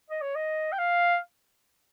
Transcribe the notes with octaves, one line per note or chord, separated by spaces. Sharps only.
D#5
C#5
D#5
G5
F5